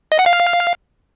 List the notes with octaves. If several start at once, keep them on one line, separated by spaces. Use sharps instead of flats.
D#5
F#5
F5